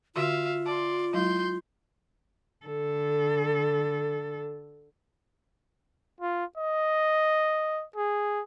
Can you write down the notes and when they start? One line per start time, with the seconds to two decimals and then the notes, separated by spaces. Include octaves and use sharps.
0.16 D3 F4 F#4 E5 F5 C6
0.66 D5 A5 C6
1.14 F#3 G#3 E4 C6 G6
2.66 D3 A4
6.20 F4
6.58 D#5
7.96 G#4